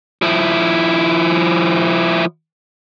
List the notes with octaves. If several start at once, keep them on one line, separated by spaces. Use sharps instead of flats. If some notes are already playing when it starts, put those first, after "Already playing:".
F3 E4